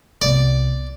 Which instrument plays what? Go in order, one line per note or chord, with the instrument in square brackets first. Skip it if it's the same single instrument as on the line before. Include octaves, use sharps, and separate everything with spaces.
[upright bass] C2 B3 [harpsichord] D5